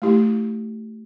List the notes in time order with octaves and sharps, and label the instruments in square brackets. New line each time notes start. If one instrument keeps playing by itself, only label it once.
[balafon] A3 E4 G4